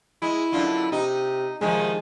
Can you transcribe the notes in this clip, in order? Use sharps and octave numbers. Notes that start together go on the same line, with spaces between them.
G#3 E4
F#2 D3 F4
C3 D#4
C3 D#3 F3 G#3